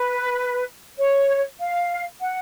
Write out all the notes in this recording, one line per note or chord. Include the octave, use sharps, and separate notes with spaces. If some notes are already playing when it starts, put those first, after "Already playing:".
Already playing: B4
C#5
F5
F#5